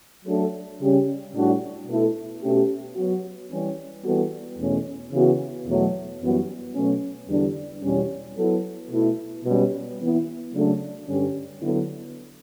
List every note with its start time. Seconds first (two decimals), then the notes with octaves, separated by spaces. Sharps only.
0.25 F#3 A3 D4 A4
0.80 C#3 G3 C#4 G4
1.34 A2 G3 D4 F#4
1.87 B2 A3 E4 A4
2.42 B2 A3 C#4 G4
2.97 F#3 B3 F#4
3.51 E3 G3 C#4
4.04 E3 G3 B3 F#4 A4
4.59 E2 B2 A3 C#4
5.13 C#3 E3 B3 F#4
5.67 E2 B2 F#3 A3
6.21 F#2 E3 G3 B3 F#4
6.74 B2 F#3 A3 C#4
7.29 E2 D3 G3 D4
7.83 E2 B2 G3 C#4
8.37 F#3 B3 E4 A4
8.91 B2 A3 E4
9.45 B2 G3 C#4
9.99 E3 B3 E4
10.54 C#3 F#3 A3 D4 A4
11.07 G2 D3 G3 C#4 G4
11.61 D3 F#3 B3 E4 A4